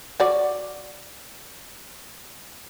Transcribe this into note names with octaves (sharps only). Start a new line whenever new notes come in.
F#4 D5